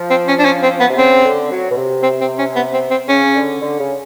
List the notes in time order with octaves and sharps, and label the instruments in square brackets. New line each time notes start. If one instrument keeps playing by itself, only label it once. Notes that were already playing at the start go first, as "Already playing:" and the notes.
Already playing: [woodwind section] F3
[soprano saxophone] C4
C#4
D4
C#4
C4
B3
[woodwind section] C3
[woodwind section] C#3 [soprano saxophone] C4
[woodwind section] D3
F#3
B2
C3
[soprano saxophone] C4
C4
C#4
B3
C4
C4
[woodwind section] C#3 [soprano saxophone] C#4
[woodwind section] D3
D3
C#3